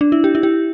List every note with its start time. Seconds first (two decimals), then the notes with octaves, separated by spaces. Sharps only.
0.01 D4
0.12 E4
0.24 G4
0.35 E4
0.43 G4